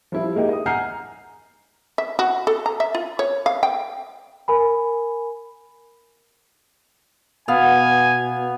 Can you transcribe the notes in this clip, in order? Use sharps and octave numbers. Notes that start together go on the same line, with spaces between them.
F3 G3 E4
G#3 A#3 D#4 G4
D#5 D#6
F#5 G#5 A#5 F6 G6 C7
E5
F#4
A4
A#5
E5
F4
C#5
F5
G5
A#4 G#5 B5
B2 B3 F5 G#5